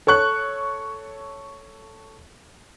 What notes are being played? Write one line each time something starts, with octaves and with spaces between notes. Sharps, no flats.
A4 C#5 C#6 F#6